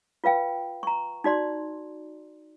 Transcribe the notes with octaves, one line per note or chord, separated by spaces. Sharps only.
F4 B4 F5 G5
A#5 C#6
D#4 F#4 D5 C6